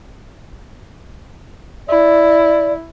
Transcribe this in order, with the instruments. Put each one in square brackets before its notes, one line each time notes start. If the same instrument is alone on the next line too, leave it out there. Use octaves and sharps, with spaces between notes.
[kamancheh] E4 [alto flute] D5